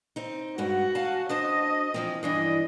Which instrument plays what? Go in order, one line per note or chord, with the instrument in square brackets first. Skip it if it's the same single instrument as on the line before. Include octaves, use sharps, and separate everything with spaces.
[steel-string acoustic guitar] C4 D#4
[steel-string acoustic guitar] G2 G#3 F#5 [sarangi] F#4
[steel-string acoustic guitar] F5 G#5 A5
[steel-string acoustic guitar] D4 C5 A5 [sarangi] D#5
[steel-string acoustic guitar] E3 F3 C4
[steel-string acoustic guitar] G2 E3 D4 [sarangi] D#5